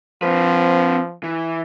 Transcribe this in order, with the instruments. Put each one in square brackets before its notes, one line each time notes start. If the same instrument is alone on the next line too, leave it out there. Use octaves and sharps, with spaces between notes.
[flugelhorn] F3 [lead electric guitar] C4 B4
[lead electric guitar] E3